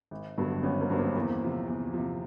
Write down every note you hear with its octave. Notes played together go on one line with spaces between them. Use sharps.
G#1
G2 D3 F#3 B3
G#1 B3 C#4
A#3 C4
G2 D3 F#3 B3
A#3 C4
C#4
E2 A#3 C4
C3 F3
E2
C3 F3